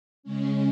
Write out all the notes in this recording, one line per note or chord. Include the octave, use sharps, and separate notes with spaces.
C#3 G#3 C#4